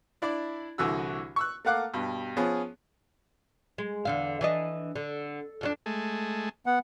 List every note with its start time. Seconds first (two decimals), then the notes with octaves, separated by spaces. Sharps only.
0.22 D4 E4 D5
0.78 C2 D3 E3 F#4 E6
1.36 C#6 E6 F#6
1.65 A3 A#3 F5 F#5 D6 F#6
1.94 G2 B2
2.37 F3 B3 C#4 G#4
3.78 G#3
4.05 E2 D3 F5
4.41 E3 D4 D#5
4.96 D3
5.61 F2 D3 D4
5.86 G#3 A3
6.66 B3 F#5